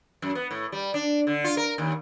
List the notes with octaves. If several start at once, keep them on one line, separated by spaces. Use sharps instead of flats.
F#2
B3
A2
G3
D4
D3
F4
A#4
D#2